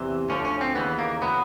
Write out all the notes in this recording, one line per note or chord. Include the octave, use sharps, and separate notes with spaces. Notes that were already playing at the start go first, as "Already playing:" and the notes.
Already playing: E2 C3 E3
D2 D3 F3 C#4
C#4
C4
D#2 C#3 E3 B3
A#3
A2 F#3 B3